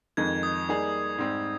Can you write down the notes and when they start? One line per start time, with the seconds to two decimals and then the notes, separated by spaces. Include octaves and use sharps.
0.17 F2 D#3 G#3 D#4 A#4 G#6
0.43 D#6
0.68 G3 A#3 D#4 G#4
1.18 G#2 G3 C4